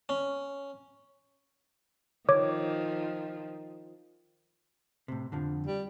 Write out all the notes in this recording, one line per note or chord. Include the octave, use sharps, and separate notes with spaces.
C#4
D#3 F3 C#5 D6
A2 C3
F2 D3 F3
G3